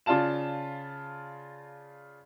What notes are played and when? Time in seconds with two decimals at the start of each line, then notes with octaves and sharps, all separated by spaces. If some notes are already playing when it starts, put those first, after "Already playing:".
0.06 C#3 F4 D5 F5 A5 E7